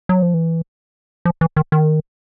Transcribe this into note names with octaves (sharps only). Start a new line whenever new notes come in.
F#3
F3
E3
F3
E3
D#3
D#3